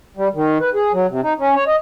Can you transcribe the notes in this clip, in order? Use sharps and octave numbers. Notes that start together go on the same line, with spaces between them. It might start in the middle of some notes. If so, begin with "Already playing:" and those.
G3
D#3
B4
G#4
F#3
C3
D#4
C#4
C#5
D#5